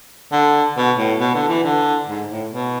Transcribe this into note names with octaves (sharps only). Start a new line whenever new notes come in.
D3
B2
A2
B2
D3
E3
D3
G#2
A2
B2